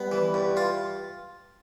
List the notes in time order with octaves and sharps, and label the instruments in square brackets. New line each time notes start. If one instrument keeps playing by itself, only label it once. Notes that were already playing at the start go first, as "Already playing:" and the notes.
Already playing: [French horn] G3 [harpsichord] B3
[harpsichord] E3
G2
F4